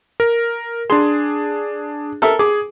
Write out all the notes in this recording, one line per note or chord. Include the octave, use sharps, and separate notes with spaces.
A#4
D4 G#4 C6
A4 A#4 E5
G#4 D6